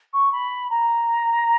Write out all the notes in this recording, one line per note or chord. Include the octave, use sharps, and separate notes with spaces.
C#6
B5
A#5